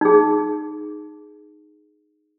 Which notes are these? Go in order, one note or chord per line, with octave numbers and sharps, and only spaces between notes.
D#4 G#4